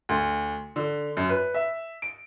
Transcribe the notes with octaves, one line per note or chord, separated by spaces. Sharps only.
D2
D3
F#2
B4
E5
D7